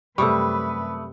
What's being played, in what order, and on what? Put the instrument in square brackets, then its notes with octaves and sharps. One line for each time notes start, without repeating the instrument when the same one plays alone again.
[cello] F#2 B4 [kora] C3 G3 [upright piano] A3 C#6 [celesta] D#6 E6